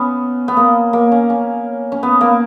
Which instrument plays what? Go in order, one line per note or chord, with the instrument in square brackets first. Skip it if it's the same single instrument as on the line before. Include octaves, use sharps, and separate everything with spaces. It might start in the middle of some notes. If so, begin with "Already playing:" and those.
Already playing: [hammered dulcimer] B3 C#4
B3
A#3
A#3
C#4
C#4
C#4
B3
A#3